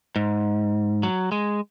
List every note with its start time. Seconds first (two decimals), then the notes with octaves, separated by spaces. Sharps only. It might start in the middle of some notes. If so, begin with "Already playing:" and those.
0.16 G#2
1.03 F#3
1.32 G#3